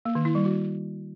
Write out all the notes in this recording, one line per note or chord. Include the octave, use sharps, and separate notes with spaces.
A#3
D#3
E4
G3
F#4